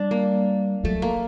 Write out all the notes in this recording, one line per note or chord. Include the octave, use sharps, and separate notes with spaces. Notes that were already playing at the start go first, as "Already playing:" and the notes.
Already playing: G3 D4
A#3
F#3 A3
A#3